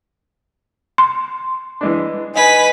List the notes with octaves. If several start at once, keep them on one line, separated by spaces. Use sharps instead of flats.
C6
E3 G#3 D4
D#4 B4 G#5 B6